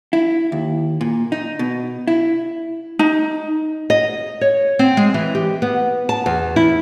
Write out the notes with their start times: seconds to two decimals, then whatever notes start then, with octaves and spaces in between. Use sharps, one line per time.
0.13 E4
0.52 D#2
1.01 A#2
1.32 D#4
1.59 B2
2.08 E4
2.99 D#4
3.90 D#5
4.41 C#5
4.79 C4
4.97 G#3
5.14 E3
5.35 G4
5.62 B3
6.09 A5
6.26 E2
6.56 E4